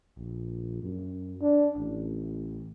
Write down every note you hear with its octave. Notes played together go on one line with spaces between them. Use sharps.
A#1
F#2
D4
A1